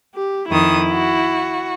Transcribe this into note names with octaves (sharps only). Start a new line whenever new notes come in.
G4
F2 D#3 E4 D#6
F#4